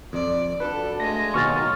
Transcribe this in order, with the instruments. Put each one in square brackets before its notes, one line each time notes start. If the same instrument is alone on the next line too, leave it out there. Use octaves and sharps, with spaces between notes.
[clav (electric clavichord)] F2 [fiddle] D5
[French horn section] D4 F#4 [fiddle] A4 [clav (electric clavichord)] B4
[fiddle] G#3 F4 [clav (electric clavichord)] A3 [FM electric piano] A#6
[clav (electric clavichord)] D#2 B2 G#5 [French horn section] D#3 F#3 [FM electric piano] C#6 F6 A6